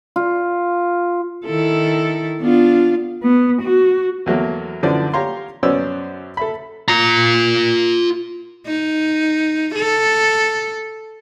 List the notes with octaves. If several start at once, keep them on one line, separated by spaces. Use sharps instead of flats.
F4
D#3 E4 A4
B3 D4 F4
B3
F#4
E2 F#3 A3 A#3
F#2 D3 E3 F3 C5 D5
G4 C#5 F5 A#5 C6
F#2 B3 C#4 C5 D5 E6
A4 E5 B5
F4 A#5
D#4
A4